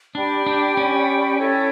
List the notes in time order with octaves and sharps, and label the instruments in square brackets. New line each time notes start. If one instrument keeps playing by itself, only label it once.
[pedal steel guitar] D4 [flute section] G4 D5 G5 B5
[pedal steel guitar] D4
C#4
[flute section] E4 A4 C#5 G5